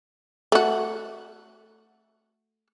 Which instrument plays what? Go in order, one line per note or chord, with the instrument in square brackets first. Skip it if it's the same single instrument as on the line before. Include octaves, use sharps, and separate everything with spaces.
[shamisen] A3 F#4